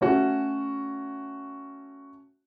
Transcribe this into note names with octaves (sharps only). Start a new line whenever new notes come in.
A3 C#4 F#4